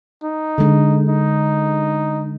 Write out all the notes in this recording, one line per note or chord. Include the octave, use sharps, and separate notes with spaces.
D#4
D3 G#3
D#4